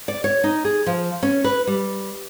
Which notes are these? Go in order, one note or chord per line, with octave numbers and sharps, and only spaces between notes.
D5
C#5
D#4
G#4
F3
C#4
B4
G3